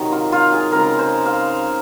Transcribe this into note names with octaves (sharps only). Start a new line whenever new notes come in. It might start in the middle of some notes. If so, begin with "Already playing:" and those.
Already playing: C3 D#3 F#3 D#4
F4
F4
G#4
C#3 G#3 C4 A#4
C5
F5